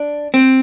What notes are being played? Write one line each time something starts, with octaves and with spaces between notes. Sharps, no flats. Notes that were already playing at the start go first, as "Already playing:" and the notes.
Already playing: D4
C4